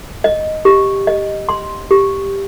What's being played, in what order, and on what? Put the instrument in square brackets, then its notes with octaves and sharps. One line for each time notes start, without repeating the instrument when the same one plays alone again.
[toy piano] D#5
G4
D#5
C6
G4